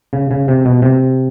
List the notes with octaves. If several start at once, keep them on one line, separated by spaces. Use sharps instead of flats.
C#3
C#3
C3
B2
C3